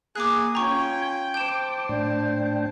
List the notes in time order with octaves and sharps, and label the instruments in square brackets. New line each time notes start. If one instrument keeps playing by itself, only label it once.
[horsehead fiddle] A#3 [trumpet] G#4 [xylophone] D6 F#6
[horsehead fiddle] C#4 F4 [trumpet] G5 [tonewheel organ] G#5 [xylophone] A#5 C#6
[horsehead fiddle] C5 A5 [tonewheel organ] D6 [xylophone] G6 E7
[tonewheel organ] A2 D4 G5